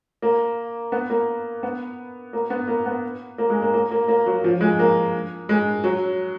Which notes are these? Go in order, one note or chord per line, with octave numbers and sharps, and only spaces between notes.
A#3
B3
A#3
B3
A#3
B3
A#3
B3
A#3
G#3
A#3
A#3
A#3
A#3
F#3
F3
G#3
A#3
G#3
F#3